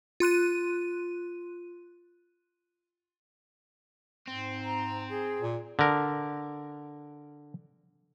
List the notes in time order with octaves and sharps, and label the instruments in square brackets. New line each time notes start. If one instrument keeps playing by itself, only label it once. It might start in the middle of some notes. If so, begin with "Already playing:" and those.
[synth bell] F4 C6 F#6 D#7
[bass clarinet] G#2 [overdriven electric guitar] C4
[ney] A#5
G#4
[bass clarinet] A#2
[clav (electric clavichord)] D3 A#4